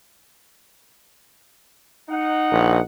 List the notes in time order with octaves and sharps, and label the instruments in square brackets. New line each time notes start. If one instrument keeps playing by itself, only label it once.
[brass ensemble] D#4 F#5
[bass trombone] A#1